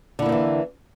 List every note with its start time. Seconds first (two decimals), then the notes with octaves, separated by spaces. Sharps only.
0.19 D3
0.22 E4
0.26 A#3
0.29 F3
0.32 E3